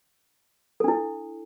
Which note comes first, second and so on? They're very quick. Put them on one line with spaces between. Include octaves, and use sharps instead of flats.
A4 D4 E4